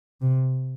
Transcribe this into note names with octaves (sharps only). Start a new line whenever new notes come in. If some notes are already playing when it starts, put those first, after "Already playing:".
C3